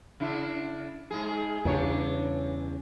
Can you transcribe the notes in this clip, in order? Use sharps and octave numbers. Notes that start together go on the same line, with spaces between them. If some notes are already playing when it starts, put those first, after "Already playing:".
C#3 D4 E4
G#2 G#3 G#4
E2 G2 C#3 D4 C#5